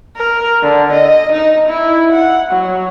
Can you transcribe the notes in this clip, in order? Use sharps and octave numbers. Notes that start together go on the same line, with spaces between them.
A#4
D3
D#5
D#4
E4
F#5
F#3